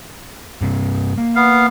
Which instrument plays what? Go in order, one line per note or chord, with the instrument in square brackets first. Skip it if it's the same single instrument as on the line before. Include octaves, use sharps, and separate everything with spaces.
[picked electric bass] G2 C3
A#3
[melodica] B3 F5